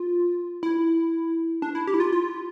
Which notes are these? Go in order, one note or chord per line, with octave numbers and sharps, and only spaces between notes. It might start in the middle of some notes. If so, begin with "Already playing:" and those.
Already playing: F4
E4
D4
E4
G4
E4
F4
F4